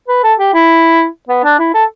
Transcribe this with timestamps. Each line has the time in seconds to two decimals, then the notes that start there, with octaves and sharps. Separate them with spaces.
0.08 B4
0.23 A4
0.39 G4
0.54 E4
1.29 B3
1.44 D4
1.59 E4
1.74 A4